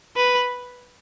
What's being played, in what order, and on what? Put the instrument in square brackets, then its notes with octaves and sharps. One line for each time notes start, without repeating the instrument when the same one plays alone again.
[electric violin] B4